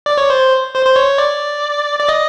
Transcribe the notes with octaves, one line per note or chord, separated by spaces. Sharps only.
D5
C#5
C5
C5
C5
C#5
D5
D5
D#5